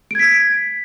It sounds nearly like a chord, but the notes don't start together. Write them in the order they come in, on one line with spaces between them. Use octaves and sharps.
D7 G#6 B6